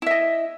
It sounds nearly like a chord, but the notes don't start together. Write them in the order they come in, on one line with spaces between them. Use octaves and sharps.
E4 E5 D#5